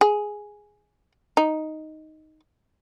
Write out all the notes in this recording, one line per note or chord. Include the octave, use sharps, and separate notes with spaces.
G#4
D#4